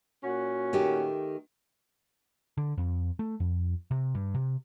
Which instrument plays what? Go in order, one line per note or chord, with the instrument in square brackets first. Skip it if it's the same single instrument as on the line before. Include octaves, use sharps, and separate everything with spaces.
[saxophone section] A#2 C#4 F#4
[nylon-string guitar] D#3 A3 G4
[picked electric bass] D3
F2
A3
F2
C3
G2
C3